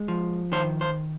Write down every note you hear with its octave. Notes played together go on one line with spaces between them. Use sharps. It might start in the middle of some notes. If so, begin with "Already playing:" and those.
Already playing: G#3
F3
D#3 C5
C5